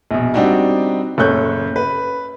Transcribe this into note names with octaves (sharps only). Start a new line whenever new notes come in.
A#1 B2
G3 C4 D4 D#4 F#4
F#1 A#2 A4 C#5 F#6 G6
B4